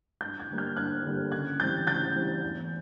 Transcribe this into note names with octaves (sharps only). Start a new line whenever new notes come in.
G2 G6 A6
F#6 G#6
D3 G3 A#3
F6 G6
G2 F#6 G#6
D3 G3 A#3
C#3 F#6 G#6
E3 G3 C4 G6 A6
C#3 G6 A6
E3 G3 C4
E2